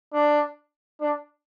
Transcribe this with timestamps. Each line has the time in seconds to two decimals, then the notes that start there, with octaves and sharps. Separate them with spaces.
0.13 D4
1.01 D4